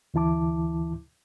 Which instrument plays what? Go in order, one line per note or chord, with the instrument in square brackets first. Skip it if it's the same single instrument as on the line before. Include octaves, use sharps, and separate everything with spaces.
[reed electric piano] D2 E3 E4 A5 D6